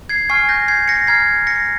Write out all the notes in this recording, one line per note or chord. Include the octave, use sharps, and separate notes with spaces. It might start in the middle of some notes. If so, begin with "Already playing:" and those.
G#6 C7
G#5 C#6 F6 G#6 C7
G6 A#6
G#6 C7
A#6 C#7
A#5 F6 G#6 C7
A#6 C#7